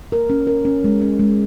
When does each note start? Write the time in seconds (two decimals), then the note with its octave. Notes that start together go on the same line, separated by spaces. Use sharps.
0.12 A#4
0.30 C#4
0.47 A#4
0.65 C#4
0.84 G#3
1.01 C#4
1.19 G#3